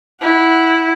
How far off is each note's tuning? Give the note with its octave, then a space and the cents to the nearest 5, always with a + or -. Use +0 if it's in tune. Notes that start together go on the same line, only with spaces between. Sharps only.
E4 -10 F#5 +0